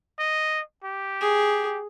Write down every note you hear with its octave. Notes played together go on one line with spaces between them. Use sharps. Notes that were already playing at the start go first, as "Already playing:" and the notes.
D#5
G4
G#4